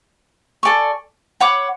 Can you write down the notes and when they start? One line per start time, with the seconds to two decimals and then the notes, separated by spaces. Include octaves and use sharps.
0.63 A4 D5 G#5 C#6
1.40 C#5 F#5 B5 D6